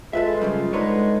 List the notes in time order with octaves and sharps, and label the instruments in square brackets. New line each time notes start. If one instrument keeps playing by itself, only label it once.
[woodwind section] G#3 F4 [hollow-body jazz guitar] A4 B4 E5
[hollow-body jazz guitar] F#2 C#3 G3
[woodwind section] D3 G#3 [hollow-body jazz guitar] D#4 B4 C#5